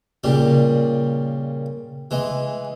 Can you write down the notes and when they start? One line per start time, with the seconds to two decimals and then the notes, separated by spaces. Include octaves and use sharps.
0.24 A#2 C#3 G3
2.11 E3 G#3